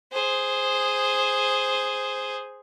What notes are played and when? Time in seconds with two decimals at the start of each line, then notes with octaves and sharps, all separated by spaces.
0.12 G#4 C5